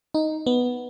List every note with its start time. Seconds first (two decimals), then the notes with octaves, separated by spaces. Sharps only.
0.14 D#4
0.46 B3